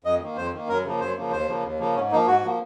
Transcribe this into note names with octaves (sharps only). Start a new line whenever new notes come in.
F2 D#5
D#3 A#3
F2 C5
D#3 A#3
F#2 A#4
C#3 F3 A#3
F#2 C5
C#3 F3 A#3
D#2 C5
C#3 F3 A#3
D#2
C#3 F3 A#3
G#2 C#4
F3 A#3 D#4
G#2 F#4
F3 A#3